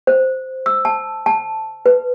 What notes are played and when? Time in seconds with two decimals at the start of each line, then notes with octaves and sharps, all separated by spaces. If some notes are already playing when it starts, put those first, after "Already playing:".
0.07 C5
0.66 E6
0.85 A5
1.26 A5
1.86 B4